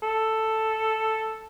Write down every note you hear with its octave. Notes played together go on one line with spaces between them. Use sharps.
A4